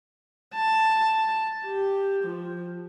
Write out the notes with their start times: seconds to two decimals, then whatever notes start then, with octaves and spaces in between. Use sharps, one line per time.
0.55 A5
1.65 G4
2.24 F3